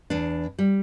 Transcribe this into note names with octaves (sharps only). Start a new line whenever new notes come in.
E2 D4
G3